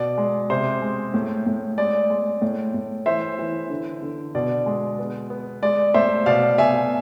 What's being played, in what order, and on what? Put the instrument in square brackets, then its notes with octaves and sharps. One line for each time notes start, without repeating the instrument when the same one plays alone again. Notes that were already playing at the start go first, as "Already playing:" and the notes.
Already playing: [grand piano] B2 D5
G#3
C3 C5
G#3
A2
A2
G#3 D5
G#3
A2
A2
E3 C5 E5
E3
D3
D3
B2 D5
G#3
B3
B3
G#3 D5
A2 C5 E5
B2 D5 F5
B2 E5 G#5